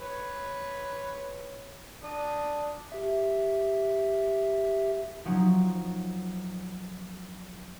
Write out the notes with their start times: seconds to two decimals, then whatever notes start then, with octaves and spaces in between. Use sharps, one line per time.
0.01 B4 C#5
2.04 D4 D#6
2.92 G4 E5
5.25 F3 F#3 C#4 D#4